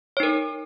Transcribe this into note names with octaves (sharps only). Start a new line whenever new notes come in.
D#4 A#4 C#5